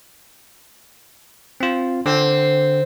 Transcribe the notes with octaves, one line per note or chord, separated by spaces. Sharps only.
C4 F4
D3 C4